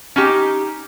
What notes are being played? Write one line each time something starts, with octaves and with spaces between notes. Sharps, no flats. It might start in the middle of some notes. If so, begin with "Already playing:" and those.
C#4 D#4 G4